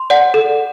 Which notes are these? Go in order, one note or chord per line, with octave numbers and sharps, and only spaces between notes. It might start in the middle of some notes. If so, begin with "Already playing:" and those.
Already playing: C6
D5 F#5
A4